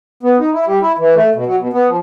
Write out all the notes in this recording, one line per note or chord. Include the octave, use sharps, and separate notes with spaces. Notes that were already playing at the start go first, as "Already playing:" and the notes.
B3
D#4
E4
G3
E4
E3
A3
B2
F#3
B2
B3
F3